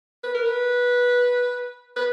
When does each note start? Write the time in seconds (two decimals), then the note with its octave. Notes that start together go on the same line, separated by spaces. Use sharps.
0.23 B4
0.34 A#4
0.46 B4
1.96 B4